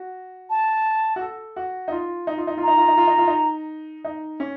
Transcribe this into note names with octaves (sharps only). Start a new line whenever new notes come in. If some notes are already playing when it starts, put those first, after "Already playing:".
Already playing: F#4
A5
F#4
A4
F#4
D#4
F4
D#4
F4
D#4
F4
A#5
D#4
F4
D#4
F4
D#4
F4
D#4
D#4
C#4